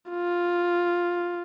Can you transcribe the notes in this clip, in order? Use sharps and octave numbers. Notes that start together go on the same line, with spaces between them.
F4